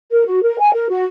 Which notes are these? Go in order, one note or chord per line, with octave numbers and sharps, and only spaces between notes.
A#4
F#4
A#4
G#5
A#4
F#4